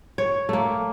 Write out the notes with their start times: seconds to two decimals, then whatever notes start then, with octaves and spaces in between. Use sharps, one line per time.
0.18 C#5
0.49 A3 A#3